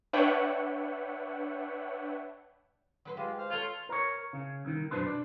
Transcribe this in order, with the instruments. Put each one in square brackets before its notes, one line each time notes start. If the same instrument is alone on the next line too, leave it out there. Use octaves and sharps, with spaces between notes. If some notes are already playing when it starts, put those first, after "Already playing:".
[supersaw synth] D4 B4 C#5 E5 F#5 G5
[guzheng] F#3 B4 C6
[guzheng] G#3 [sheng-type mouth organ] F4 G4
[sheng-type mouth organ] C5 F5 F6
[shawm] F4 [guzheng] A4 C5 [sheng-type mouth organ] C#5
[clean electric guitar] A#4 C#5
C#3
C2 D#3
F#2 B2 D4 B4 C5
D4